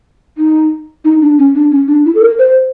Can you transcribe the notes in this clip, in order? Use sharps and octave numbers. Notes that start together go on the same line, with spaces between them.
D#4
D#4
D4
C#4
D4
C#4
D4
E4
A4
A#4
C5